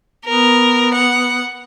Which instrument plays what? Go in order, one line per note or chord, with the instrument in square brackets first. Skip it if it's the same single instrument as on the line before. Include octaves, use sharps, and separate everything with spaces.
[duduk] B3 [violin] A#4
[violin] F#5